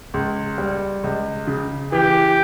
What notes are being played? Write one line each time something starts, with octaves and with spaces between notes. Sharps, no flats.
C#2
G3
C#2
C#3
E3 G4